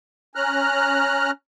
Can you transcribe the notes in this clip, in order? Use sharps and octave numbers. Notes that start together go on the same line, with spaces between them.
C#4 A#5 F6 F#6